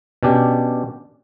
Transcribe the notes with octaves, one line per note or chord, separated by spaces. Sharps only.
B2 C#4 D4 G4